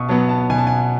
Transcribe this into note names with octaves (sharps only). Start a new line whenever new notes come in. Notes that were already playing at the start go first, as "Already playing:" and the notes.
Already playing: B2 C#6 D#6
F#3 B3 A5
A5
B2 G#5
A5
G#5